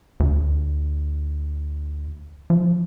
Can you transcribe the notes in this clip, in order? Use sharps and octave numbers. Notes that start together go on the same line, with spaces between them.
D2
F3